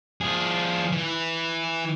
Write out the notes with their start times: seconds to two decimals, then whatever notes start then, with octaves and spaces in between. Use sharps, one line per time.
0.21 F3 G#4
0.92 E3